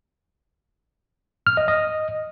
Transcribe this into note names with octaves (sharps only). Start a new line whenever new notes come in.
F6
D#5
D#5